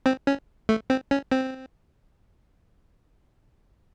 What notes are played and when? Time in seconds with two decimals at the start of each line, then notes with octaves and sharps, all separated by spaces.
0.06 C4
0.27 C#4
0.69 A3
0.90 C4
1.11 C#4
1.32 C4